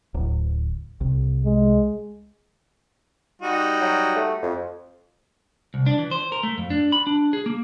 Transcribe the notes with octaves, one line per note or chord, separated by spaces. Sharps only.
D1
C2
G#3
G3 D#4 F#4
F#3
A3
F2
C2
D4
E3
C5
A#4
A3
F2
D4
B5
D4
G#4
A#3